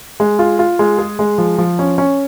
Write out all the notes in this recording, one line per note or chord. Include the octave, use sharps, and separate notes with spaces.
G#3
F4
F4
G#3
G#4
G#3
F3
F3
C#4
C#4